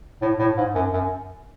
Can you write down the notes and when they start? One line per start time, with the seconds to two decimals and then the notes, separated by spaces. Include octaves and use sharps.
0.21 A2
0.39 A2
0.57 G#2
0.75 F#2
0.93 F#2